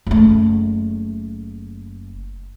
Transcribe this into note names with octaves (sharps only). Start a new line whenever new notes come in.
F#1 A3